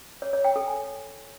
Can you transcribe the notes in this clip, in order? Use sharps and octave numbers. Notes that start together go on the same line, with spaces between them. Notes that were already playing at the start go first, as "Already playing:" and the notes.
C#5
C#5
G5
A4
G#5